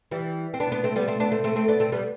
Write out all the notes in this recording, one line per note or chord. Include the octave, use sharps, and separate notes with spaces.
E3 G3
C4
B3 D4
B3 D4
A3 C4
G3 B3
A3 C4
B3 D4
A3 C4
A3 C4
A3 C4
B3 D4
A3 C4
G3 B3